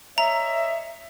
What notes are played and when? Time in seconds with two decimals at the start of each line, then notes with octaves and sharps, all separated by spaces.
0.18 C#5 D#5 E5 A#5